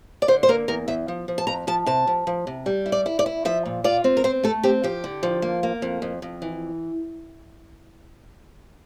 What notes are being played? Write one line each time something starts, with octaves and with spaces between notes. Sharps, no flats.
D5
D3 C5
C5
A#3 A#4
E2 A#4
E2 E5
F3
F3
A5
F2 A#5
F3 A5
C3 A5
F3
F3
C3
G3
E4
D5
E4
D5
E4
F3 E5
A#2
F4 D5
C4
A#4
C4 C5
A3 A4
C4 G4
F3 G4
D3
F3
A#3
A#3
F2
F2
F2
E3